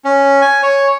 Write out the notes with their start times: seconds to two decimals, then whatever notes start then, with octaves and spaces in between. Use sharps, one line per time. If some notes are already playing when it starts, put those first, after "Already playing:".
0.05 C#4
0.42 G#5
0.63 C#5